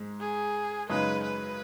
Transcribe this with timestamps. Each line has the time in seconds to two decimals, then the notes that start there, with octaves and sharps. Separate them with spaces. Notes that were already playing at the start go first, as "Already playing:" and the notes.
Already playing: G#2 G#3
0.20 G#4
0.89 F#2 C#3 G#3 D#4 B4
1.24 B4